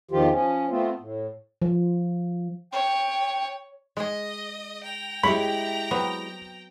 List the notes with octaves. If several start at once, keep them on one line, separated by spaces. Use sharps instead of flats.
E2 D#3 F3 F4 G4
F3 C#4
A3 B3 C4 F4
A2
F3
C#5 G5
G#3 G#4 D#5
G5 A#5
G#3 E4 G4 C#5 B5
F#3 B3 C4